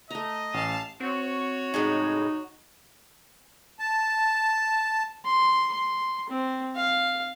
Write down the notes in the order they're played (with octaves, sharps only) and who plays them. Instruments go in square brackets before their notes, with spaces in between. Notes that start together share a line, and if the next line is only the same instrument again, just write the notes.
[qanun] A3 A#5 [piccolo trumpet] D#5
[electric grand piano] A1 [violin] F5 A5
[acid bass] C4 [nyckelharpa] F#4 C#5
[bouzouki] A2 C#3 G#3 [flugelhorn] D#4
[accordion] A5
[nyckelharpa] C6
C6
C4
F5